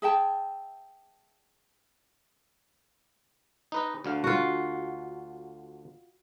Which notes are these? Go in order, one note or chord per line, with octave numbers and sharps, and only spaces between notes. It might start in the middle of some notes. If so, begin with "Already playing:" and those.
G#4 E5 G5 A5
D#4 B4 D#5
D2 D3 F5
F4 F#4